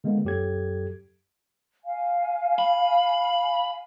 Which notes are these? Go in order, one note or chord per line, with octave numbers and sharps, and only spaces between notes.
D3 G#3 A#3 B3
F#2 F#3 G4 A4 G#6
F5 G#5
B5